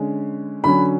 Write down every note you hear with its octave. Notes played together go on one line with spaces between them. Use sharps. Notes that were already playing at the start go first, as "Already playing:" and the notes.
Already playing: D3 G#3 C#4
D3 F#3 C#4 B5